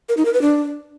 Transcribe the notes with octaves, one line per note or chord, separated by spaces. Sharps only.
A#4
D#4
A#4
B4
D4